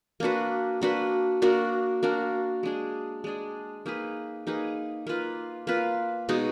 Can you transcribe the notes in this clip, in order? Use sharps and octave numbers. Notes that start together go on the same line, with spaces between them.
A#3 D4 F#4 B4
A#3 D4 F#4 B4
A#3 D4 F#4 A#4
A#3 D4 F#4 A#4
G#3 D4 G#4
G#3 D4 G#4
A#3 D#4 G#4 B4
A#3 D#4 G#4 B4
A#3 F4 B4
A#3 F4 B4
B2 G#3 D#4 F#4